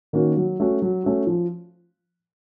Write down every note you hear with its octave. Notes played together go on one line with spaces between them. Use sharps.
D#3 A#3 C#4 F#4
F#3
A3 C#4 F#4
F#3
A3 C#4 F#4
F3